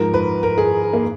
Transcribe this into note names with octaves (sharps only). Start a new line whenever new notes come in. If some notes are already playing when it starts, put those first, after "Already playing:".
Already playing: G#2 F3 A#4
B4
A#4
G#4
A#3